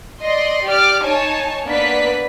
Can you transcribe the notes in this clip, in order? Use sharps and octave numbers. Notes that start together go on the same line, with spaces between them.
D5 D#5 C6
G4 D5 D6 F6
D#4 C#5 G#5 A5
A#3 B3 D4 B4 D5 B6